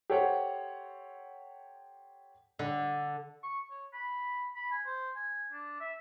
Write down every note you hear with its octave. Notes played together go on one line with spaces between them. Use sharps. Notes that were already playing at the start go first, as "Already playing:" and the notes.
G4 A4 C5 C#5 F#5
D3
C#6
C#5
B5
B5
G#5
C5
G#5
D4
E5